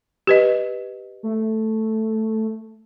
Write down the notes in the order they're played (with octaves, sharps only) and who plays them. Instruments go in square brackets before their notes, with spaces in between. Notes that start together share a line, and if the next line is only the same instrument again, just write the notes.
[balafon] G4 B4 D#5
[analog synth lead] A3